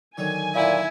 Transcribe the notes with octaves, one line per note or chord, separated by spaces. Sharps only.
D3 D#3 F#3 G#5
A#2 E4